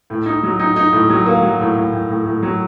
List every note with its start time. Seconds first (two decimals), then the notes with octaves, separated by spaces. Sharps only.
0.10 A2
0.26 D#4
0.43 F#3
0.59 D#4
0.76 D#4
0.93 A2
1.10 F#3
1.26 A#3
1.42 F#3
1.60 A2
1.76 A2
1.93 A2
2.09 A2
2.26 A2
2.43 F#3